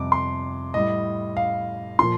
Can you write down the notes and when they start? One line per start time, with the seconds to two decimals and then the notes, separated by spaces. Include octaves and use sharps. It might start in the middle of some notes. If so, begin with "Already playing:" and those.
Already playing: F2 C3 G3 D6
0.12 C6
0.74 A2 G3 D#5
1.37 F5
1.99 A#2 F3 C6